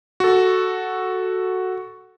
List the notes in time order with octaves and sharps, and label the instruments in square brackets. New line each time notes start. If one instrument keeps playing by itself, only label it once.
[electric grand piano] F#4 A4